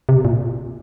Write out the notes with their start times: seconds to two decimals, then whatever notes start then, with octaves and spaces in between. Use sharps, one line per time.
0.09 C3
0.25 A#2